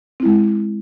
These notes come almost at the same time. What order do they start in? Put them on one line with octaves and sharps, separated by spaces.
C4 E4 G#3